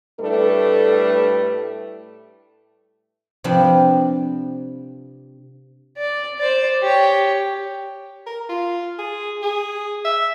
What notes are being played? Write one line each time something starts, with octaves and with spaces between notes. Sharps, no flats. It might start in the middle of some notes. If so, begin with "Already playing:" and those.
A2 G3 A3 D4 A4 B4
C3 F3 C4 D4 G4 B4
D5
C5 D5
G4 C#5
A#4
F4
G#4
G#4
E5